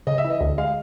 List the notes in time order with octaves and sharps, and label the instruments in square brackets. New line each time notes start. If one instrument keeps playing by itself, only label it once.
[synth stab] C#3 [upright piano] D#5
[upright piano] E5
[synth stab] E3
[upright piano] D#5
[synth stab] D2
[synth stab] G#3 [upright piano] F5